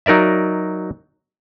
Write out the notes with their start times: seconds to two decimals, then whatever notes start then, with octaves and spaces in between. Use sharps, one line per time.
0.06 F#3 D#4 A#4 D5 E5